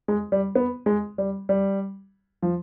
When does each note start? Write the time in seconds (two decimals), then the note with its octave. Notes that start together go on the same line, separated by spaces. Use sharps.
0.08 G#3
0.32 G3
0.55 B3
0.86 G#3
1.18 G3
1.49 G3
2.43 F3